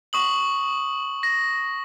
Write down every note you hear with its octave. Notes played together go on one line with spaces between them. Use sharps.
C#6 D#6 F#7
A#6